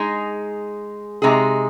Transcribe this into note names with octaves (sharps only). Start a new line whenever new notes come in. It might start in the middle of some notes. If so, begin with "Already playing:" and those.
Already playing: G#3 D#4 G#4
C3 G#3 D#4 G#4